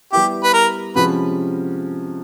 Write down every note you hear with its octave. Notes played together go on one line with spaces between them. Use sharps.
G3 B3 E4 G4
B4
A#4
C3 F3 G#3 C#4 F#4 B4